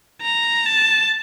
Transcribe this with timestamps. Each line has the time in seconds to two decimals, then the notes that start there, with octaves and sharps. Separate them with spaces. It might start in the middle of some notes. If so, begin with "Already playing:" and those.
0.22 A#5
0.66 A5